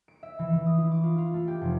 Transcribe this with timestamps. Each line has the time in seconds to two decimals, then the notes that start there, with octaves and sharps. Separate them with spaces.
0.08 D7
0.23 E5
0.39 E3
0.52 E3
0.66 D#6
0.78 E4
0.91 D6
1.03 F4
1.18 F4
1.34 A3
1.47 G4
1.61 F1